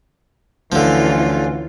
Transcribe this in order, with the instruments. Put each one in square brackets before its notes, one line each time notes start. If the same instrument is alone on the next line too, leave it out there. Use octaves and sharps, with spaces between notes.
[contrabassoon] D2 [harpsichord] D3 F3 [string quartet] E3 C#4 F4